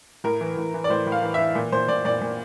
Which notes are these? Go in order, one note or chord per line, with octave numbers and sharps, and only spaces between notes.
A2 A#4
E3
A2
E3
D5
A2 C5
A2
F5
E3
E5
E3
A#2
A#2 C5
A#2 D5
A#2 D5
A#2